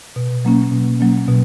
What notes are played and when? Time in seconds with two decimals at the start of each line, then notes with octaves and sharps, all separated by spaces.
0.16 B2
0.45 F#3 A#3 C#4
0.71 B2
1.00 F#3 A#3 C#4
1.28 B2